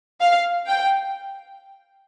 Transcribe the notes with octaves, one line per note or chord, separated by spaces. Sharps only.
F5
G5